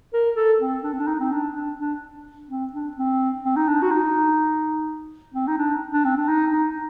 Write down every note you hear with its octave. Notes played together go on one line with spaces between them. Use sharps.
A#4
A4
C4
D4
C4
D4
D#4
C4
D4
D4
D4
C4
D4
C4
C4
D#4
D4
F#4
D#4
C4
D#4
D4
D4
C4
D4
D#4
D#4